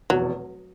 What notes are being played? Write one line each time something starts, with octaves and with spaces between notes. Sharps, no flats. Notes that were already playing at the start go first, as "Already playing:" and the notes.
F1 E2 B2 F#3